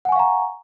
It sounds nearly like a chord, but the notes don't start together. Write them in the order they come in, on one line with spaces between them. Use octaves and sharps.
F#5 G#5 C#6 F5 A#5